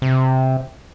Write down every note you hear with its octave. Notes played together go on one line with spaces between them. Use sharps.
C3